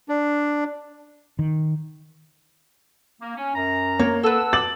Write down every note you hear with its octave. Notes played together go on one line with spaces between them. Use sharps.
D4
D#3
A#3
C#4
F#2 A#5
A#3 C#5
A4 B4 F#5 A5 E6
D6 A6 F#7